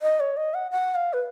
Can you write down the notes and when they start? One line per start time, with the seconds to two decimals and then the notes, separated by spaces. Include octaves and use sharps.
0.02 D#5
0.20 C#5
0.37 D#5
0.54 F#5
0.72 F#5
0.95 F5
1.13 B4